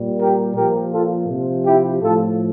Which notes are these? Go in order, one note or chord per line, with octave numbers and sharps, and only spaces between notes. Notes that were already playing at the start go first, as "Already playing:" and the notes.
Already playing: A#2 G3
G4 A#4
A#2 F3 G4 A#4
F4 A4
C3 F3
E4 G4
A2 F3 F4 A4